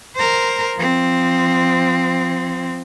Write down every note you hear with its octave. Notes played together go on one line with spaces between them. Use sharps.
A#4 C5
F3 C4